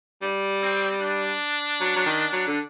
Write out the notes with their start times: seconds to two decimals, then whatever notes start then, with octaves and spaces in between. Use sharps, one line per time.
0.22 G3
0.62 C4
1.01 D4
1.81 F#3
1.96 F#3
2.06 D#3
2.33 F#3
2.48 D3